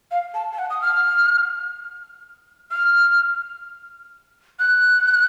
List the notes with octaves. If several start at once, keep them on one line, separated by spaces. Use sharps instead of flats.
F5
A5
A5
F#5
D#6
F6
F6
F#6